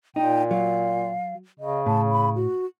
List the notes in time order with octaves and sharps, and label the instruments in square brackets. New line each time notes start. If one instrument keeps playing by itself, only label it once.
[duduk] A#2 [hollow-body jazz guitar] D#4 [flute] G5
[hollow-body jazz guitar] F#3 [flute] F5
[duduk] C#3 [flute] D#5
[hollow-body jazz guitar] A2 [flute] A5
[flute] B5
F#4